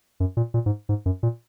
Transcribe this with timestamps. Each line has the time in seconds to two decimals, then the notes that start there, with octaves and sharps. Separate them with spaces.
0.20 F#2
0.37 A#2
0.54 A#2
0.66 G#2
0.89 G#2
1.06 F#2
1.23 A#2